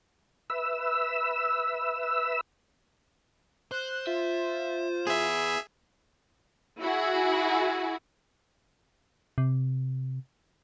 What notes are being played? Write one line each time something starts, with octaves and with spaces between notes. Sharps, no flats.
B4 E5 E6
C5 F#6
F4 E5
B3 E4 G#4 E5
E4 F#4 G#4
C3